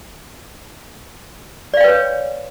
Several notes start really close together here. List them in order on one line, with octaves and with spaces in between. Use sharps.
D5 F5 G5 B4 C#5